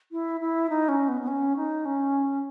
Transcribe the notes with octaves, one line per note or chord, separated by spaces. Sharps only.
E4
E4
D#4
C#4
B3
B3
C#4
D#4
C#4